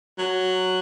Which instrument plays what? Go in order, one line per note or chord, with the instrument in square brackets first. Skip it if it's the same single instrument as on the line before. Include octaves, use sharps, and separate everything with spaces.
[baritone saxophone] F#3